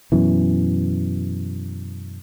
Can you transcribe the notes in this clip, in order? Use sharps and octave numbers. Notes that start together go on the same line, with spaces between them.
F#2 B2 E3